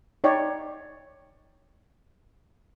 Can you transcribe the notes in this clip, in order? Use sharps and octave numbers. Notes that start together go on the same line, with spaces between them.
D#4 C#5 D5 G5